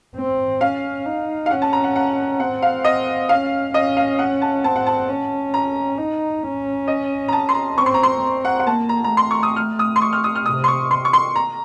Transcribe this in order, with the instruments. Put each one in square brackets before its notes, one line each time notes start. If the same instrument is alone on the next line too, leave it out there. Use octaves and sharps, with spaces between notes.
[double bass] C4
[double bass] C#4 [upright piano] F5
[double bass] D#4
[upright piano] F5
[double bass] C#4 [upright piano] F#5
[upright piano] A5
A#5
F#5
F#5
[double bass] C4 [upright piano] F#5
[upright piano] F5
D#5
[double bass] C#4 [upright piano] F5
[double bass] C#4 [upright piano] D#5
[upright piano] F5
F#5
A5
[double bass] C4 [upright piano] A5
[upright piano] F#5
A5
[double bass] C#4
[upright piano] A#5
[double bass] D#4
C#4
[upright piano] D#5
A#5
A5
C6
A#5
[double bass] C4 [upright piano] C#6
[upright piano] C6
A#5
C6
[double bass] C4
[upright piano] F#5
F#5
[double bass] A#3 [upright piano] A5
[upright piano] A#5
A#5
[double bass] A3
[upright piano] C6
C#6
D#6
F6
D#6
C6
C#6
F6
D#6
F6
[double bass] C3 [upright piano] D#6
[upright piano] C6
C#6
C6
C#6
C6
A#5